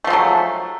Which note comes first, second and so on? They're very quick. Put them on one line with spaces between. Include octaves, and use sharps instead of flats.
A3 F3 G#3 F#3